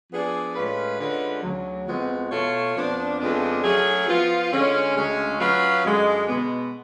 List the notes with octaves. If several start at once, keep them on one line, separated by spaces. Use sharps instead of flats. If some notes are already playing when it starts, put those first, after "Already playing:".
F3 B3 D4 G#4 D5
A2 G#3 C#4 F4 B4
D3 G#3 C#4 F4 B4
D2 C#3 F#3
F2 F3 G#3 B3 F#4
B2 A3 F4 A4 C#5
F2 F3 B3 D4
F2 C#3 G#3 B3 D4
F#3 A3 C#4 G#4
F3 B3 F4
D3 G#3 C#4
D2 C#3 G#3 C#4
F#3 C#4 F4 B4 F5
F#2 D3 G#3
B2 G#3 B3